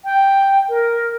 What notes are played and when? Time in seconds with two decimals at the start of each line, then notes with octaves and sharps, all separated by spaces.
0.05 G5
0.69 A#4